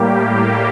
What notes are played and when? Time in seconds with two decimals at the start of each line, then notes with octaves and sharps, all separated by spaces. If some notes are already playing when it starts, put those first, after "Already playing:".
Already playing: A2 G3 A#3 G4